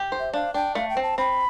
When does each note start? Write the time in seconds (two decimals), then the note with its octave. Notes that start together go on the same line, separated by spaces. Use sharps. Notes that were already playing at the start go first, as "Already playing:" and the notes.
Already playing: G4
0.12 C5
0.20 E5
0.34 D4 F5
0.54 D4 G5
0.75 A3 F5
0.90 G5
0.97 C4
1.03 A5
1.18 C4 B5